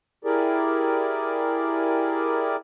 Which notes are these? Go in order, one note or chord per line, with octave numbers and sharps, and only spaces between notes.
E4 G4 G#4 A#4 D5